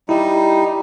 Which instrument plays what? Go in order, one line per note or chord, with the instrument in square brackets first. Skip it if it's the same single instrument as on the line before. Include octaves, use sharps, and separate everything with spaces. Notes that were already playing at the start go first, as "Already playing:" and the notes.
[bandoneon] G3 D#4 [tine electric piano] E4 G4